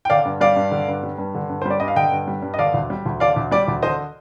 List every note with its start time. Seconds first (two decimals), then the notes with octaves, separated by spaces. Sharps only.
0.05 G5
0.10 D3 D5 F5
0.25 G2
0.41 G3 D5 F5
0.56 G2
0.72 D3
0.88 G2
1.03 G3
1.18 G2
1.35 D3
1.49 G2
1.62 C5
1.65 G3 D5
1.80 G2 D#5
1.88 F5
1.96 D3 D#5 G5
2.11 G2
2.28 G3
2.42 G2
2.54 D#5
2.59 D3 D5 F5
2.74 D2
2.90 G3
3.06 D2
3.20 D3 D5 F5
3.36 D2
3.51 G3 D5
3.68 D2
3.82 D3 C5 D#5